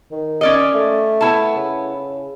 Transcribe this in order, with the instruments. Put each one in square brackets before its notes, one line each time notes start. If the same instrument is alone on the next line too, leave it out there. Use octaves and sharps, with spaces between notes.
[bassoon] D#3
[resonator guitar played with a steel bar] C#4 D5 D#5
[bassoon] A3
[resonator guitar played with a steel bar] B3 E4 A5
[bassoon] C#3